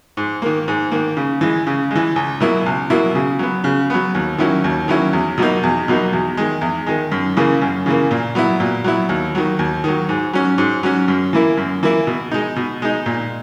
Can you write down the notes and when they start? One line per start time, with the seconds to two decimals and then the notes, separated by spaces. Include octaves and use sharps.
0.17 G#2
0.42 D#3 A#3
0.68 G#2
0.91 D#3 A#3
1.17 C#3
1.41 E3 G#3
1.67 C#3
1.91 E3 G#3
2.16 C#2
2.40 B2 F#3 A#3 E4
2.66 C#2
2.90 B2 F#3 A#3 E4
3.15 C#3
3.39 F#3 B3
3.64 C#3
3.90 F#3 B3
4.15 D#2
4.38 D#3 F#3 C#4 E4
4.64 D#2
4.88 D#3 F#3 C#4 E4
5.13 E2
5.38 B2 F#3 A#3 D#4
5.63 E2
5.88 B2 F#3 A#3 D#4
6.13 E2
6.37 D#3 G#3
6.61 E2
6.87 D#3 G#3
7.12 F#2
7.37 C#3 E3 A#3
7.62 F#2
7.86 C#3 E3 A#3
8.11 A#2
8.35 F#3 B3 E4
8.60 A#2
8.84 F#3 B3 E4
9.09 D#2
9.35 D#3 F#3
9.59 D#2
9.84 D#3 F#3
10.09 G#2
10.33 F#3 C#4
10.58 G#2
10.83 F#3 C#4
11.08 F#2
11.33 E3 A#3 E4
11.57 F#2
11.83 E3 A#3 E4
12.07 B2
12.31 G#3 D#4
12.56 B2
12.82 G#3 D#4
13.06 A#2